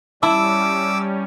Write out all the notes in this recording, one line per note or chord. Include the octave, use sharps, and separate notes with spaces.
G3 C#4 E4 A5 D6 E6